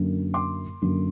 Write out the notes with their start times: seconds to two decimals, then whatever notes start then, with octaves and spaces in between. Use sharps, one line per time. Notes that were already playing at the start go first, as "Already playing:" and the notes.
Already playing: F#2 D3 F#3 A#3
0.34 C6 D6
0.82 F#2 D3 F#3 A#3